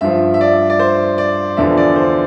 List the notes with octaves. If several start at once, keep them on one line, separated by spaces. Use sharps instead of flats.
G2 F3 E5
E5
D5
D5
C5
D5
E2 D3 F3 E5
D5
C5